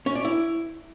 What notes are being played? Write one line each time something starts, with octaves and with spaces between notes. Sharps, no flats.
C#4
D5
E4